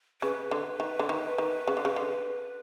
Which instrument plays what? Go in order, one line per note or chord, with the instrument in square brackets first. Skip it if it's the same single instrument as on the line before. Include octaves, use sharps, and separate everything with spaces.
[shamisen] C#3 [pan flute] B4
[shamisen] D3
D#3
D3
D#3
D#3
C#3
D3
C#3
D3